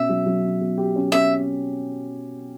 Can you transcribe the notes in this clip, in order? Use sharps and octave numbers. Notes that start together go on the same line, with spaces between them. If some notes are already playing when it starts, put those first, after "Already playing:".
Already playing: B2 C#4 E5
F#3
F#3
C#4
B2
G4
C#4
C#4 E5